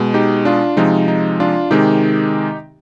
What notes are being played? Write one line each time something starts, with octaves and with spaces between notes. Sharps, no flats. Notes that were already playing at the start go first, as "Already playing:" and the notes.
Already playing: B2 G#3
D#4 G4
D4 F4
C3 F3 G#3 D#4
D#4
D4 F4
C3 D#3 G#3 D#4 G4